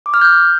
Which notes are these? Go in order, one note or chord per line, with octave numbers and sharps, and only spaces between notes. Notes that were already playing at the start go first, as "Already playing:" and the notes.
D6
F6
G6